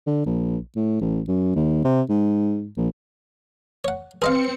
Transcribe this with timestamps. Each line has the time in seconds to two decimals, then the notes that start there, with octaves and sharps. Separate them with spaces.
0.07 D3
0.26 A#1
0.76 A2
1.01 A1
1.28 F#2
1.55 D#2
1.84 C3
2.09 G#2
2.77 A#1
3.84 C#5 F#5
4.22 C4 G#4 B4 D#5 F5 C6 C#7